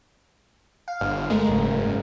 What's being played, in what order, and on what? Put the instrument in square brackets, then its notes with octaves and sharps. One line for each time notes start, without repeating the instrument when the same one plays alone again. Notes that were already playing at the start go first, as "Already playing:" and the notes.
[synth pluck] F5
[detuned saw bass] G1
[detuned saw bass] G#3 [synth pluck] A3 A#4
[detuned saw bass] F#1 [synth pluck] G#2 C#3